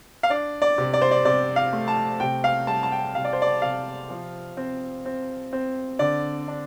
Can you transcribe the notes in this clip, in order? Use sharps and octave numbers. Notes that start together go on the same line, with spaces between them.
F5
D4 D5
D5
C3
D5
C5
D5
C3 D5
F5
A3
A5
C3 G5
F5
G3 A5
A5
G5
C3 F5
D5
C5
D5
C3 F5
F3
C4
C4
C4
D3 D5
D4